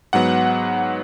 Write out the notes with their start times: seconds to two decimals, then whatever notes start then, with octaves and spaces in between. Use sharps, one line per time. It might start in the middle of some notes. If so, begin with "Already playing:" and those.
0.13 G#2 F#3 B3 F#5